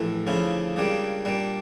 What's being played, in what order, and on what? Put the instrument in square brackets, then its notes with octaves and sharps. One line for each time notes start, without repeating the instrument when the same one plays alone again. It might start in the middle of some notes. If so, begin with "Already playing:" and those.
Already playing: [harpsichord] A#1 A2 E3 A3
D2 C#3 F3 C#4 E4
C#2 C#3 G3 A#3 D4
A#2 G3 A#3 D4